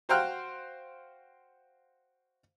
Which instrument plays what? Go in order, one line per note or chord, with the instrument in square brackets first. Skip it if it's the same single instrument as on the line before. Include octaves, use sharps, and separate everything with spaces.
[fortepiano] F#4 C5 F5 G5 F6 F#6